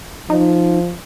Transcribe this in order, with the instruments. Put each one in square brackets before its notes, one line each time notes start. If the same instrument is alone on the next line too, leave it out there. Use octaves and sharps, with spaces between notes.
[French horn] F3 [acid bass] D#4